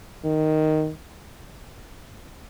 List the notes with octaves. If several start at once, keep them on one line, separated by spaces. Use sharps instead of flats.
D#3